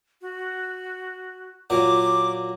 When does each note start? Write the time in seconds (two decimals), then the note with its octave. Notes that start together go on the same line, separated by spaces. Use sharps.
0.21 F#4
1.70 A#2 F#3 D6